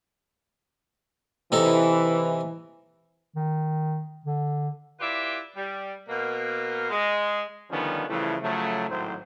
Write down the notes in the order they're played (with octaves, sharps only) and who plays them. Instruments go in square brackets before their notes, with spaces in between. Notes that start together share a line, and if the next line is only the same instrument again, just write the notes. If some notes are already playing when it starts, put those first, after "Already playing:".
[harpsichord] C3 D#4 A4 [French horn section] E3
[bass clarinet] D#3
D3
[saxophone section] E4 F4 G4 B4 D5 E5
G3
B2 A#3
G#3
[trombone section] D3 D#3 F3 G3 B3 C#4
C#3 E3 F3 G3 A3 E4
C#3 F3 F#3 A3
G#1 A2 F#3 C4 C5